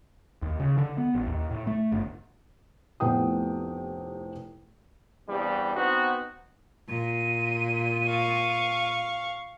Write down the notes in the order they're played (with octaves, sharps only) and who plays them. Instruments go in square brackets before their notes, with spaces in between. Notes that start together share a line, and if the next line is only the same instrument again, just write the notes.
[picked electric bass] D#2
C#3
D3
B3
A1
D#2
A2
A3
G1
[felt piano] F1 A2 C3 B3 G5 D#6
[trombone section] E2 G2 C3 G3
B3 C4 D#4 F#4
[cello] A#2 [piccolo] D#7
[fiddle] F5 C#6